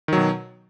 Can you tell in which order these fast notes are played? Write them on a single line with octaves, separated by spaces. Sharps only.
D#3 F#3 B2